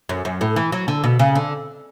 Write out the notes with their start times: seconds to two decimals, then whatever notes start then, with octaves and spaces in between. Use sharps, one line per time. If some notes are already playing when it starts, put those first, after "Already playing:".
0.09 F#2
0.25 F#2
0.41 A2
0.56 E3
0.72 F#3
0.88 D3
1.04 B2
1.19 C#3
1.35 D3